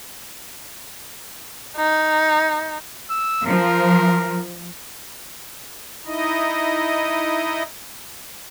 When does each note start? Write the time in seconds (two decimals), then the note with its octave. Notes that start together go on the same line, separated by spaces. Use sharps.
1.76 D#4
3.10 E6
3.46 F3 A#4
6.06 D#4 E4 D#5